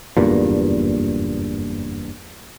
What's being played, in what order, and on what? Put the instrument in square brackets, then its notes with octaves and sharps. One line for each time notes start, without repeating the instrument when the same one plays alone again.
[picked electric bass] F#1 E2 G2 A#2